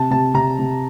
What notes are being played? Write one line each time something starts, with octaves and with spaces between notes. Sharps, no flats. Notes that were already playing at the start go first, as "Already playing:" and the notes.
Already playing: C3 A5
C3 A5
C3 A#5
C3